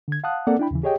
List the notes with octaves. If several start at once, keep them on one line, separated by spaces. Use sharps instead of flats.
D3 G#6
F5 F#5 A5 D#6 F#6
A#3 C4 A4 D5 F#5
D4 E4 G5 B5
D#2 C#3 E3
G4 G#4 C#5 D#5 G5